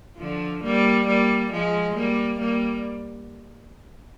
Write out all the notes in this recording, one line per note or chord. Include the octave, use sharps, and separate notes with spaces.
D3 F3
G3 A#3
G3 A#3
F3 G#3
G3 A#3
G3 A#3